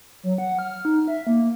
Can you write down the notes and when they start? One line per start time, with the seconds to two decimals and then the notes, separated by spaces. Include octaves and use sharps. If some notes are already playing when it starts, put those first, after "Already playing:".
0.23 F#3
0.38 F#5
0.59 F6
0.85 D#4
1.08 E5
1.27 A#3